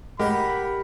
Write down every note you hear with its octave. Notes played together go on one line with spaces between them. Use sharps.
A2 G#3 G4 A#4 F#5 B5